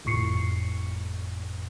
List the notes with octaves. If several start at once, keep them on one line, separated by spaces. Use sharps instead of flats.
G1 F2 A2 C#6 C7 C#7